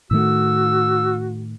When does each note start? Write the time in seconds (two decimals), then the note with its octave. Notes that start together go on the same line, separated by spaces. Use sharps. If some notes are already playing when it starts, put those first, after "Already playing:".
0.11 A2 D#3 A3 F#4 E6